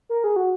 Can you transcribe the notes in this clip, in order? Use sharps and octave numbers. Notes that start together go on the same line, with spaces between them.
A#4
G#4
F#4